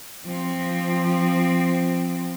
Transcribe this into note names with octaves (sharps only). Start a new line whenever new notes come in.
F3 C4